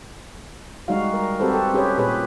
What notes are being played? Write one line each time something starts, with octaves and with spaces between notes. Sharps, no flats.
G3 G#3 D#4 F#4 F5
A#4
C4 F#4 G4 A4 B4 C5
A4
C#4 G4 G#4 B4 C#5
A#2 G4 G#4 B4 C#5